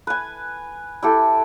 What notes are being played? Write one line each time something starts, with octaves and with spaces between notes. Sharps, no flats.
B4 G#5
E4 G4 A4